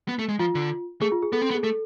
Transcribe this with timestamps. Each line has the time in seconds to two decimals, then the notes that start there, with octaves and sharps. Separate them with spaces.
0.08 B3
0.19 A3
0.29 G#3
0.39 F3 F4
0.55 D3
1.01 A3 G#4
1.12 F4
1.22 G#4
1.32 B3 A4
1.42 C4
1.51 B3
1.55 G#4
1.63 A3 A4